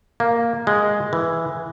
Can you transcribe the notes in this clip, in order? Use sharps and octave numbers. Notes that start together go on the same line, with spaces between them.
A#3
G#3
E3